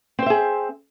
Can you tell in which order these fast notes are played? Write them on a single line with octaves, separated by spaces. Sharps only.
C4 C5 E5 G#4